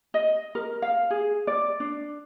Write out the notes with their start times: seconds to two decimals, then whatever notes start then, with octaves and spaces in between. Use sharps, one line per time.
0.14 D#5
0.55 A#4
0.82 F5
1.10 G#4
1.47 D5
1.80 D4